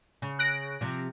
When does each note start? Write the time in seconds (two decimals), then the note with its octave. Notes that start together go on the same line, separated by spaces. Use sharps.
0.22 C#3
0.39 F#6 A#6 D7
0.81 C3 F3